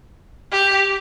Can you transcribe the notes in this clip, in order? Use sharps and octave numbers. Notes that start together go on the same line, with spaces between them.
G4